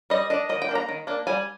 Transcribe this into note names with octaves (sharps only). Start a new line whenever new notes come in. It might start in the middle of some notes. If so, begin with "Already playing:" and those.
G3 D#5
D4 D#5
D#3 D#5
G5
A#3 D4
A#5
D#3
A#3 D4
G3 G#5